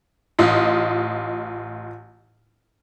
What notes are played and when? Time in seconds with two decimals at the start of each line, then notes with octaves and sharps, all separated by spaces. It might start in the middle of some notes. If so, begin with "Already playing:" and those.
0.39 A1 F4 D#5